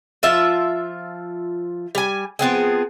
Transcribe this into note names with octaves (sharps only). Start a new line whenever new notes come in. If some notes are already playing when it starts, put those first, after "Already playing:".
F3 F4 E5
G3 G#5
F3 B3 C4 G#4